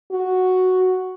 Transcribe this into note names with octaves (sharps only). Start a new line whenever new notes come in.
F#4